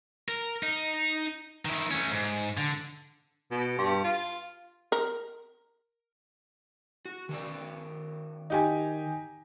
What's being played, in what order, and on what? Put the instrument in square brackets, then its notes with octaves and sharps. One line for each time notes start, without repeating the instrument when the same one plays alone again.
[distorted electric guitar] A#4
D#4
D#3 E4
A3 C#4
G#2
D3
[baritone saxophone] B2
G2
F4
[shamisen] A#4
[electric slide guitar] F#4
D#3 F#4 D5
[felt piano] D#4 G4 G#5